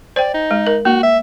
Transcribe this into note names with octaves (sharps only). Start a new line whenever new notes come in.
C5 D5 G5
D#4
G#3
A#4
A#3 F#4
E5